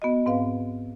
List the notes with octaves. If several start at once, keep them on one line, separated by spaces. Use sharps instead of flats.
B3 F#4 D#5
G#2 C4 B4 F5